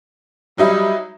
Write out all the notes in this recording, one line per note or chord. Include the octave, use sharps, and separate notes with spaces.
F#3 G3 D#4 E4